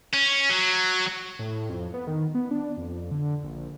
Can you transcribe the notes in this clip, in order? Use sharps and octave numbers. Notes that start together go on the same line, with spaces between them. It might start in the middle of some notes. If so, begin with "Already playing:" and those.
C#4
F#3
A2
F2
B3
D#3
B3
D4
F2
D3
A#1